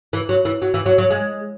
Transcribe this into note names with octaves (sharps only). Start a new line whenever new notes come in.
E3
F#3
E3
F#3
E3
F#3
F#3
G#3